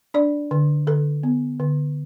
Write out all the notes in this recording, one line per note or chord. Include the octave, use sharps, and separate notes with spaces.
D4 D5
D3
D3 A4
B3
D3